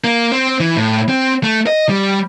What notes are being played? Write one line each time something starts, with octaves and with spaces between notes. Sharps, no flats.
A#3
C4
E3
A2
C4
A3
D#5
G3